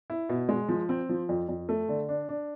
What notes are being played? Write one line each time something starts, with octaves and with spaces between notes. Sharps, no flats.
E4
B2
G#3
F3
C4
F3
F2
F2
A3
D3
D4
D4